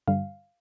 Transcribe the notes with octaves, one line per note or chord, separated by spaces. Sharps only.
G2 D3 G3 F5